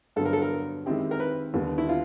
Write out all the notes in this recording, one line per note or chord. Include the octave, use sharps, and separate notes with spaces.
G2 D3 F#3 B3 A4
A#4
A4
A#4
D#3 G#3 C4 E4 G4
A#4
B4
D#2 D3 G3 B3
E4
F4